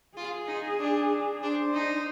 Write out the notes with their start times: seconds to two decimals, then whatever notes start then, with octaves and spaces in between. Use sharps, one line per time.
0.17 F4 G#4
0.47 D#4
0.79 D4
1.42 D4 C5
1.74 D#4